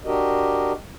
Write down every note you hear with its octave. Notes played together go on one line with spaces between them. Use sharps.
D4 F#4 G4 A#4 D#5